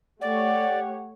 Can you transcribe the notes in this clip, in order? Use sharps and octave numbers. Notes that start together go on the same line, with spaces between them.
A3 G4 C#5 D5 F#5